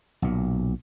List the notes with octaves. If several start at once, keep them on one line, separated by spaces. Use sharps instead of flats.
B1 A#2